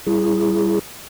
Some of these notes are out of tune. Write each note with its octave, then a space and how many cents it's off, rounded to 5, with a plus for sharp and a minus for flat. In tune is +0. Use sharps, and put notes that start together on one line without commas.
G3 +0 E4 +25 G#4 +0